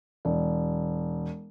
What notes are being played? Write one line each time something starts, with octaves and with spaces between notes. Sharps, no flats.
E1